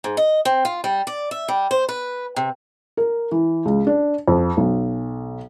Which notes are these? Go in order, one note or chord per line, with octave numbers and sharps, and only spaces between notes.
G#2
D#5
C4
F4
G3
D5
E5
G3
C5
B4
C3
A#4
E3
C#2
D4
F2
B1